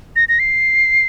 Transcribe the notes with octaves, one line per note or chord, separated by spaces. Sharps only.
A#6
A#6
C7